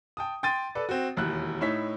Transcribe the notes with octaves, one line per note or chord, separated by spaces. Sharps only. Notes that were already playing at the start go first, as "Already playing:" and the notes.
G5 A5 D#6
G5 C6 A6 D#7
A4 B4 D5
C4 F#4
E1 D#2 E4 F#6
A2 D#4 E4 C#5 B6